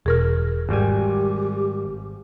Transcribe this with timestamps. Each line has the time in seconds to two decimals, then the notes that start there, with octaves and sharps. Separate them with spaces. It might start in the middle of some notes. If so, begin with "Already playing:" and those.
0.06 E1 G#4 A#4 F6
0.69 G#1 G3 G4 G#5